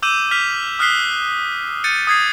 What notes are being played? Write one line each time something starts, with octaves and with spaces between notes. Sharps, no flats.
D6 E6 G6 D#7 E7 F#7
F6 G6 B6 F7
D#6 F6 F#6 B6 C7 G7
G6 A6 C#7 D#7
D#6 G#6 C7